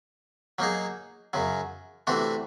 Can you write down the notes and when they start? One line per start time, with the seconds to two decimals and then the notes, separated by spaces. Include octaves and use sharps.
0.58 F#3 A#3 D#4 G#4
1.33 F#2 C#3 F#3
2.07 C3 E3 A3 D4 F#4